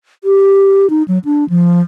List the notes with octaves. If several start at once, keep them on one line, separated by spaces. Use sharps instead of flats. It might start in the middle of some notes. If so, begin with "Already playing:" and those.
G4
D#4
F#3
D4
F3